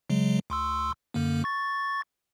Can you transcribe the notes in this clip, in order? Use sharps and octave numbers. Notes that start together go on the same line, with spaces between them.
C#3 F#3 G#3
D2 C6 E6
F#2 D3 A#3
C#6 A6